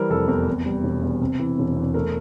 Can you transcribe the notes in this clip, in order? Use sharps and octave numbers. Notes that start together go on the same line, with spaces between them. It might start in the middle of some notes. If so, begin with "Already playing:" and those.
Already playing: E3 G3 A#4 C5
F1 A4
E2 A#4
C3
G3
E1
E2
C3
E3
E1
E2
A3 A#4